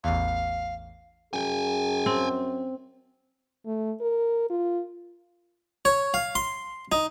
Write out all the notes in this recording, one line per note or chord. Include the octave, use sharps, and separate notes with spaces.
A1 E2 F5
F#2 G#4 G5 G#5
C4
A3
A#4
F4
C#5
F5
C6
D#4